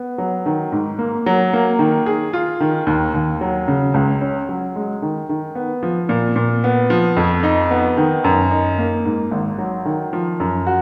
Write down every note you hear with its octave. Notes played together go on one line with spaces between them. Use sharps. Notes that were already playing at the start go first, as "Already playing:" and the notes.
Already playing: B3
F#3
D#3
G#2
A#3
F#3
A#3
D#3
G#4
F4
D#3
D#2
D#2
F#3
C#3
C#2
C#4
F#3
G#3
D#3
D#3
B3
F3
A#2
A#2
B3
F3
F2
D#4
B3
D#3
F#2
D#4
A#3
G#2
G#1
F#3
D#3
F3
F#2
F#4